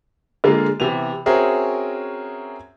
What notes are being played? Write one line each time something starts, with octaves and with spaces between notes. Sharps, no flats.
D3 G#3 A#3 F4
C3 E3 B3 F7
C4 C#4 F#4 G#4 A#4 E5